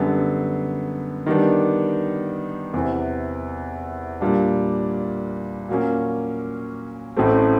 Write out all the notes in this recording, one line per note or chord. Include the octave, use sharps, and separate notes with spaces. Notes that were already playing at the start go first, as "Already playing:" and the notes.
Already playing: F#2 D3 G3 B3
D#3 G3 B3 D4
E2 C3 E3
A#2 G3 A#3 D4
A#2 F#3 A#3 C#4
A1 A2 F#3 A3 C4